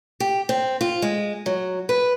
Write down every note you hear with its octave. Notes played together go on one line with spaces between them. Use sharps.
G4
C4
F4
G#3
F#3
B4